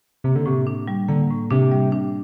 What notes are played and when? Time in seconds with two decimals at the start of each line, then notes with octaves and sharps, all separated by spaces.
0.24 C3 A#3
0.36 D3
0.46 A2 C3
0.67 D4
0.88 G3
1.08 D3 A#3
1.30 A2
1.50 C3 D4
1.71 G3
1.92 D4